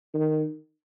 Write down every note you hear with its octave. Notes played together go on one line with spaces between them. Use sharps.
D#3